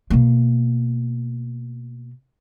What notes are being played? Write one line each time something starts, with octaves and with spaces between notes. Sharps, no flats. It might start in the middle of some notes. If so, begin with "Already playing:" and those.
B2 A#3